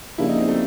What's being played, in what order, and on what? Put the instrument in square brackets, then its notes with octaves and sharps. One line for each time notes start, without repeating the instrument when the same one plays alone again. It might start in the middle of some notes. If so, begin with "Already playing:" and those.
[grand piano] C#3 F3 A#3 D4 G4 [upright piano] E4
[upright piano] D#4
C4
A3